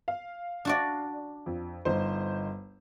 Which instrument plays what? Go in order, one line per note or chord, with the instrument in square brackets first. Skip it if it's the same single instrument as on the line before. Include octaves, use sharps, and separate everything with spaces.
[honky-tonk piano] F5
[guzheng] D4 F#4 D5
[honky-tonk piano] F2
G1 D#4 C5